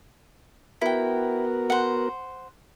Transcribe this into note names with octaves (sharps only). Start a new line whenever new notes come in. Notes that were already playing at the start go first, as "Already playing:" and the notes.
B3 E4 F#4 A#4 G5
C5 F#5